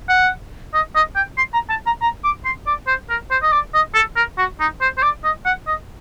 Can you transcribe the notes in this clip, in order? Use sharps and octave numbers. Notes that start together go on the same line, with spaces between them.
F#5
D#5
D#5
G5
C6
A#5
A5
A#5
A#5
D6
C6
D5
C5
A#4
C5
D#5
D5
D#5
A4
A#4
F#4
D#4
C5
C5
D5
D#5
F#5
D#5